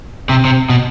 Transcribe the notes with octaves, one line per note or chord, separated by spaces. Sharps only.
C3
C3
B2